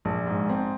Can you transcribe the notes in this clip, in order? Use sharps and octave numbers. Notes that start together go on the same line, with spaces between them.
A#1
G#2
C4